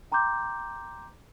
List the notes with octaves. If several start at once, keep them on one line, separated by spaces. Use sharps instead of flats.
G5 A#5 C6 D6 G6